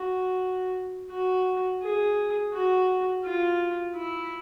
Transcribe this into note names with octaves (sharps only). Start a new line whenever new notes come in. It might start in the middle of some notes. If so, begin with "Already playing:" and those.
Already playing: F#4
F#4
G#4
F#4
F4
E4